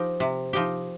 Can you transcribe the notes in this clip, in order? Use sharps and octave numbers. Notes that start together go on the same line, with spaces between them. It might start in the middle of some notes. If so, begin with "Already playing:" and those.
Already playing: F3 D#4 G4 C5
C3
F3 D#4 G4